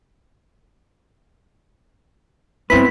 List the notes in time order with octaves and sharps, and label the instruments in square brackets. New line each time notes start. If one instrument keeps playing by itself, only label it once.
[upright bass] G2 B3 [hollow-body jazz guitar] C4 E4 B4 [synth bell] B6